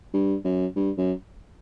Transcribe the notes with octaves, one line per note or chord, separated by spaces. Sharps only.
G2
F#2
G2
F#2